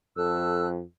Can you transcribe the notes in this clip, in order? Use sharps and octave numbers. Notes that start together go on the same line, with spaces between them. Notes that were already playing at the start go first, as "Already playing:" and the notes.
F2 A4 E6 F#6